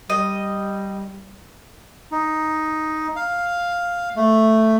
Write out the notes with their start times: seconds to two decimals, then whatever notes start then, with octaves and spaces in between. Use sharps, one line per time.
0.10 G3 D#5
2.12 D#4
3.16 F5
4.16 A3